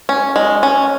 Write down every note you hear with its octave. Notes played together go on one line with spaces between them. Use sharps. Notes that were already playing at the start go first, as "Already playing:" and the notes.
C#4
G#3
C#4